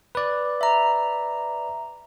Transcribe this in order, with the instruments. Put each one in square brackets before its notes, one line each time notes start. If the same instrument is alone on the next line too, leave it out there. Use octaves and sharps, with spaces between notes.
[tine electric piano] B4 D5
[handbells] E5 A#5